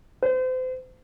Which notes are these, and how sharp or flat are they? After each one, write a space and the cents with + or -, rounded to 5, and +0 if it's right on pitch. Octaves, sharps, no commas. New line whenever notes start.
C5 -35